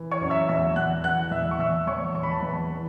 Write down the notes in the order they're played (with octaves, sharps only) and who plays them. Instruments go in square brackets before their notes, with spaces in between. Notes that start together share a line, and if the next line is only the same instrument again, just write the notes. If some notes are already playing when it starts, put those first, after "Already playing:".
Already playing: [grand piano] E3
C#5 C#6
F#2
E5 E6
E2 E5 E6
E2 F#5 F#6
E3 F#5 F#6
E2 E5 E6
C#6
E2 E5 E6
E2 C#5 C#6
E2 C#6
B5
A5
E2 B4 B5
E3